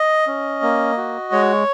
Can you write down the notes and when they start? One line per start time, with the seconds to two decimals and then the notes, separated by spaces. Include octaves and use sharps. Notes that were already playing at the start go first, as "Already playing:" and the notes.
Already playing: D#5
0.27 C#4
0.62 A#3
0.97 F#4
1.32 G#3 C#5